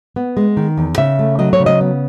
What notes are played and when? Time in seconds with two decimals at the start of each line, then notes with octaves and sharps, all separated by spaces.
0.16 B3
0.37 G#3
0.57 D#3
0.78 E2
0.98 C#3 E5
1.19 A3
1.39 F#3 D#5
1.53 C#5
1.60 C#3
1.66 D#5
1.81 B3